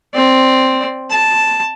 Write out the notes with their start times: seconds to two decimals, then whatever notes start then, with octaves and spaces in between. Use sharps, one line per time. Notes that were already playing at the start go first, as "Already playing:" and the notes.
0.14 C4 D5
1.10 A5